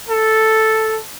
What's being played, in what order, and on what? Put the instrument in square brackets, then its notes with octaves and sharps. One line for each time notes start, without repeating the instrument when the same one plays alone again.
[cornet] A4